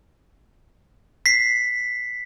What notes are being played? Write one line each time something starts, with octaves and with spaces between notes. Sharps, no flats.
B6 C7